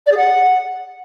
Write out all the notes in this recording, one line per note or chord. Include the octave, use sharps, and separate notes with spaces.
D5
G#4
F#5